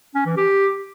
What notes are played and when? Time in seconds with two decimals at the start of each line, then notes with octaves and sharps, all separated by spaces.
0.15 C#4
0.26 E3
0.37 G4